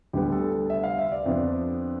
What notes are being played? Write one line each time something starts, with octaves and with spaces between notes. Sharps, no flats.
D2 D3 G3 B3 G4
A4
A4
E5
F5
E5
D5
F2 D3 F3 B3 D4